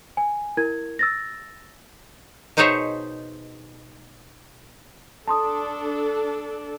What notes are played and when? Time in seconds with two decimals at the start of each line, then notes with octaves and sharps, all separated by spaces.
0.17 G#5
0.57 E4 A#4 G#6
0.99 E6 A6 A#6
2.57 B2 D#4 G#4 C5 C#5 E5
5.28 D4 A4 A5 C6 D#6